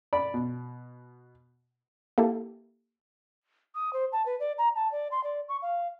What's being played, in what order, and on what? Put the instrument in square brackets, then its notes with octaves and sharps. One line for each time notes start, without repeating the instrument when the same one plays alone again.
[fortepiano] D5 B5
B2
[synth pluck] A#3 E4 G4 A4
[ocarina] D#6
C5
A5
B4
D5
A#5
A5
D5
C6
D5
C#6
F5